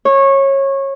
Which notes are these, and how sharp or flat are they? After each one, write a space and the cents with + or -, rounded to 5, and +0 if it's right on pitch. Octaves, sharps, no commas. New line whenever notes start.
C#5 -20